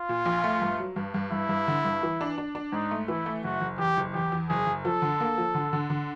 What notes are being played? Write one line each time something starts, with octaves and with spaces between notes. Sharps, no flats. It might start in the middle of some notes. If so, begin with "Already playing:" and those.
Already playing: F4
A#2
A#1
A3
G2
F#3
G2
G2
G2 E4
G2
D3
G2
E3
D4
D4
D4
G#2 D#4
A3
E3 E4
A3
F#1 F#4
F#1
E2 G4
F#1
E2 G4
E2
F#1 G#4
F#1
F3 A4
D3
A#3
F3
D3
D3
D3